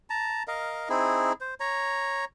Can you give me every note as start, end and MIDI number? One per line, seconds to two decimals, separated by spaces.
0.10 0.43 81
0.10 0.43 82
0.48 0.89 70
0.48 0.89 75
0.48 0.89 77
0.89 1.33 60
0.89 1.33 63
0.89 1.33 64
0.89 1.33 68
1.41 1.54 72
1.60 2.25 73
1.60 2.25 82